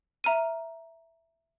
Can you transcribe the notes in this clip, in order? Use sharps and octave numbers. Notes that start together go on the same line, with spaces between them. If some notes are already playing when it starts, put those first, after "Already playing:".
E5 A#5 F6 D#7